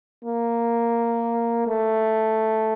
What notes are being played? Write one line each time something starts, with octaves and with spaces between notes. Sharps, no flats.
A#3
A3